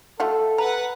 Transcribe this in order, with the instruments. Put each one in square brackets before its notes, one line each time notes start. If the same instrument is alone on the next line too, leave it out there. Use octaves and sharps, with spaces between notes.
[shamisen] A3 F4 F#4 [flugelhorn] A4
[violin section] B4 F#5 [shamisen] A#5